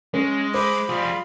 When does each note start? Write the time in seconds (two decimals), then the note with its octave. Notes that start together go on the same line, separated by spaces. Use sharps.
0.14 G#3 C#4
0.54 C5 B5 D6
0.89 G3 F4 G#4